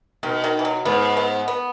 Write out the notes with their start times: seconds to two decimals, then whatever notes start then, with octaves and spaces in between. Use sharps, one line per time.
0.23 B2 D#3
0.44 D#3
0.59 E3
0.65 F#3
0.85 G#2 B3
1.17 B3
1.48 B3